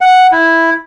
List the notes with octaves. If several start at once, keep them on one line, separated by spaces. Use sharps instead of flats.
F#5
E4